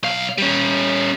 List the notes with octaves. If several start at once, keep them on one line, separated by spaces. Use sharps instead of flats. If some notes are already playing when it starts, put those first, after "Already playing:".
B1 F5
G3 C#4